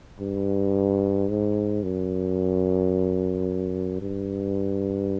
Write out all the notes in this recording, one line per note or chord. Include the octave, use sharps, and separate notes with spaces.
G2
G#2
F#2
G2